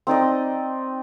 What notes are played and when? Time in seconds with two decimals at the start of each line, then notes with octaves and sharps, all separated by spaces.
0.07 C4 D#4 D5 D#5